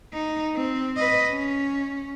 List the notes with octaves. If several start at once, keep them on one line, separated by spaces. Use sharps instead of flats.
D#4
C4
B4 D#5
C#4